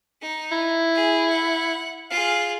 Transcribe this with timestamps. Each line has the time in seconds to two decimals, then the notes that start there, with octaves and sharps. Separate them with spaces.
0.21 D#4
0.52 E4
0.95 G#4
1.30 F#5
2.11 F4 G#4 F5